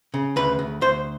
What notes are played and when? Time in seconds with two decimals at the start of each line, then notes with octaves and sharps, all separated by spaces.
0.14 C#3
0.36 D2 B4
0.59 D2
0.81 D2 C5